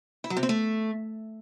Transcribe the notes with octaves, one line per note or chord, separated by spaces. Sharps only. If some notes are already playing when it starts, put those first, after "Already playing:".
E4
F#3
C3
C4
A3